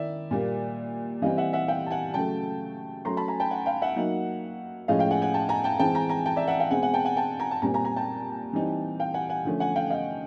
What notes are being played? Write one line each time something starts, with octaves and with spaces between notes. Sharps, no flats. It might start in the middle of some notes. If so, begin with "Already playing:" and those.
Already playing: D#3 E4 D5 E5
A#2 G3 A#3
E3 G3 C4 D#5 F5
E5 F#5
E5 F#5
F5 G5
A5
F#5 G#5
C#3 F#3 A3 G5 A5
F#3 A3 C#4 A#5 C6
A5 B5
G#5 A#5
G5 A5
F#5 G#5
F5 G5
E5 F#5
F#3 A#3 D#4
A2 F3 G#3 C#4 D#5 F5
F5 G5
F#5 G#5
F#5 G#5
G5 A5
G#5 A#5
G5 A5
E3 G#3 C4 G5 A5
G#5 A#5
G#5 A#5
G5 A5
D5 E5
E5 F#5
F5 G5
B2 G#3 C4 F#5 G#5
F#5 G#5
G5 A5
F#5 G#5
G5 A5
G#5 A#5
A5
A#2 G3 C4 G#5 A#5
G#5 A#5
G#5 A#5
G5 A5
E3 G3 C4 D#4
F5 G5
F#5 G#5
F#5 G#5
D3 F3 A3 C#4
F#5 G#5
F5 G5
D#5 F5